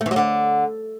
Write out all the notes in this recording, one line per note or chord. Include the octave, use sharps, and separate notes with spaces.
A3
E3
F#3
D3